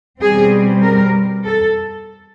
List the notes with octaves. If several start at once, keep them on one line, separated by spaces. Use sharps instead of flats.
B2 G3 C4 G#4
A#4
A4